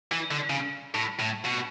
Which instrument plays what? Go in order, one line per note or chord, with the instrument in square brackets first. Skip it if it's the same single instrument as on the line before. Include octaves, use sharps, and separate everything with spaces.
[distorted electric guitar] E3
D3
C#3
A2
A2
B2